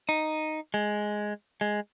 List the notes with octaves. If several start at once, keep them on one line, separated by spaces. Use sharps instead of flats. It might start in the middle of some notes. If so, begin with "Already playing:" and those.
D#4
G#3
G#3